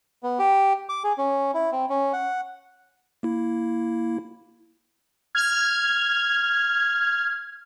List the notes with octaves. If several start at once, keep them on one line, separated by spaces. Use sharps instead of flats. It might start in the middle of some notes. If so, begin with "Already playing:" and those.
B3
G4
D6
G#4
C#4
E4
C4
C#4
F#5
A#3 E4
F6 G#6